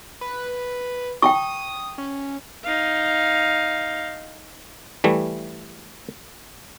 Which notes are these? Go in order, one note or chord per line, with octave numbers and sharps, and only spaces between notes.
B4
G5 A5 C#6 D#6
C#4
D#4 F5
E3 G3 A3